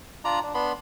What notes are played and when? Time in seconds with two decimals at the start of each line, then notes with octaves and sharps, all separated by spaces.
0.25 D4 F4 D5 A#5
0.43 D4
0.54 B3 D4 B5 C6